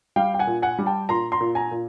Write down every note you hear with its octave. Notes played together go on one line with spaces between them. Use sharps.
G3 F5 G5
G5
F#5 G#5
A#2
F#5 G#5
G3
G5 A5
A#2 A#5 C6
A#5 C6
A#2
G#5 A#5
A#2